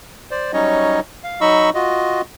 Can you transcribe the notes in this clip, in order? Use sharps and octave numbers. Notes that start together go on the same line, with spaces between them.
C5 D5
F#3 G3 C#4 D#4 C#5 D#5
F5
F#3 D#4 D#5 B5 C#6 E6
F4 F#4 D#5